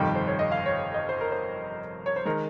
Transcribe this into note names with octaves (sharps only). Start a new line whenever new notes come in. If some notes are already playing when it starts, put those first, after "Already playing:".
Already playing: G1 F2 C3 D#3 G3 G5
C5
C#5
D#5
F5
C#5
D#5
C5
A#4
C5
C#5
C5
D#3 G#3 A#4